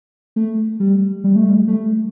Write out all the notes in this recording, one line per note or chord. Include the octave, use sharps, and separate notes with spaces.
A3
G3
G3
A3
G3
A3